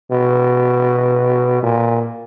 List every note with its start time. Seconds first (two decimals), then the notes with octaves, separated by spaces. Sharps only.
0.11 B2
1.63 A#2